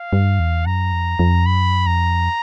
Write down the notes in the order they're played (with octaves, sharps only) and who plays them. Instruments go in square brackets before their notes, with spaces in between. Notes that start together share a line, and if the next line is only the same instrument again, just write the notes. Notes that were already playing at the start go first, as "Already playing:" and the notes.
Already playing: [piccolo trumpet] F5
[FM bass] G2
E2
[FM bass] F#2 [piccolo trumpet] A#5
[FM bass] F2
F2
[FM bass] F#2 [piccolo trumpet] B5
[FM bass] F2 [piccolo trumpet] A#5